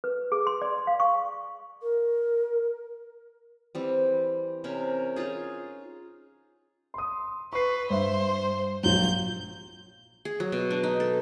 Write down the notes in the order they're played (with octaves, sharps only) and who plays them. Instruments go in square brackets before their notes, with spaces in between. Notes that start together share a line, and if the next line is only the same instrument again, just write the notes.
[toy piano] B4
G#4
C6
D5
F5
C#6
[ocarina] A#4
[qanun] E3 G3 C4
C3 C#4 A#4
C#4 D#4 F4 G#4
[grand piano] C6 D#6
[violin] B4 [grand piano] C#6 C7
[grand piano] G2 E5 [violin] C5
[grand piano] A#1 F3 F#3 [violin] G6
[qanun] G#4
F#3
B2
D4
D#4
A4